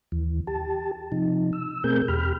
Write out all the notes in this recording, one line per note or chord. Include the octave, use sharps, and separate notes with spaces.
D#2 E3
G4 A5
C3 F3 D#4
E6
B2 A3 C4 G#4 A#4 G6
E2 G4 B5 F6